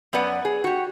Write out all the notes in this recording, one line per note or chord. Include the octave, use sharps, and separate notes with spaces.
F#2 B3 B4 D5 F#5
G#4
F#4 G4